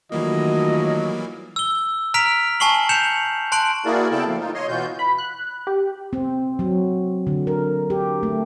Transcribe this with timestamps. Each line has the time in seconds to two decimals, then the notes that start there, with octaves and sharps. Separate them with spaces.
0.12 D#3 E3 F#3 G3 A3 A#3 F4 D#5
1.56 E6 G7
2.14 A#5 F6 B6 D7 F7
2.60 G#5 A5 C#6 C7 F#7
2.89 G6 C#7 E7 F7
3.52 A5 C6 F#6 D7 F#7
3.85 A#3 E4 F#4 G#4 A#4 D5
4.11 C#3 B3 E4 A4 G5 A5
4.27 F3 A3 A#3
4.39 D#4 F4
4.54 C#5 D#5 C6
4.68 B2 E3 F4 F#4 G6
4.99 B5
5.18 F#6
5.67 G4
6.13 C4
6.59 F#3
7.27 D3
7.47 A#4
7.90 G4
8.23 A3